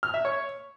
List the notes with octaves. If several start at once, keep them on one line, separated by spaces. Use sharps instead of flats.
F6
E5
C#5